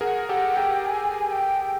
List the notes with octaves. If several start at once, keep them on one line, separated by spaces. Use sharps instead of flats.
G#4 A#4 F#5
G4 A4 F#5
G#4 A#4 G5
G#5
G#5
G5